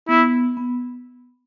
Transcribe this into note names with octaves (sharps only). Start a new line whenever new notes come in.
B3 E4
B3